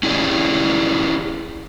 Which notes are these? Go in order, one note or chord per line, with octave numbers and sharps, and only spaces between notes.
C#4 E4 G4 G#4 D5